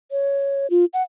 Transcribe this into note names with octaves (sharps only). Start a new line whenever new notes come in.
C#5
F4
F#5